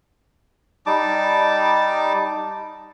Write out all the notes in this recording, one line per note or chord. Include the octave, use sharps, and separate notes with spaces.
G3 D#4 A5 D6